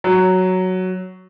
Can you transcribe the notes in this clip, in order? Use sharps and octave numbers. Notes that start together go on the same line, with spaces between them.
F#3